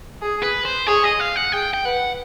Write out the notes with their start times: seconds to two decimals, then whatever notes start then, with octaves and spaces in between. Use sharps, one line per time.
0.22 G#4
0.43 B4
0.65 C5
0.87 G#4 C#5
1.04 D#5
1.20 F5
1.36 F#5
1.52 G#4 G5
1.74 G5
1.85 B4 F#5